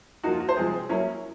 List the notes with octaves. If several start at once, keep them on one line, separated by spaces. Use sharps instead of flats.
F3 A#3 D#4 F#4
F4
F#4
C5
C3 F3 G#3 C4 G#4
F#3 A#3 C#4 E4